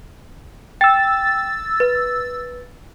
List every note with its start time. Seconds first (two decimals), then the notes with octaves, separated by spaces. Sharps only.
0.81 G5 E6 A6
1.80 B4